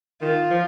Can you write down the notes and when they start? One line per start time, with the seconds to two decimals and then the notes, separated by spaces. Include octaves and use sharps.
0.22 D#3 F4
0.50 F3